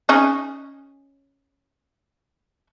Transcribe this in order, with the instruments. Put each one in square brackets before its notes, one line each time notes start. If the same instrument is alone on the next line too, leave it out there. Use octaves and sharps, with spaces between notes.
[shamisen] C#4 D#4 G#4